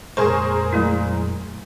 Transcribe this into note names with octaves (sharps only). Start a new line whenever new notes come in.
F2 A#2 G#3 G#4 A#4 C5 C#6
F#3 A3 E4